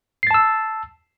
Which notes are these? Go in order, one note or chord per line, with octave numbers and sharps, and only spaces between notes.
A5 E6 A6 C7